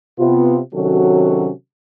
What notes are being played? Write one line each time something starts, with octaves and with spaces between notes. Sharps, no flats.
C3 B3 F4
C3 D#3 F#3 C#4 F#4 A4